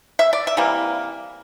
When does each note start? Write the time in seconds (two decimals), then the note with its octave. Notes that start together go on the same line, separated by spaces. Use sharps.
0.19 E5
0.33 D5
0.47 E5
0.57 C3 E3 G3 A#3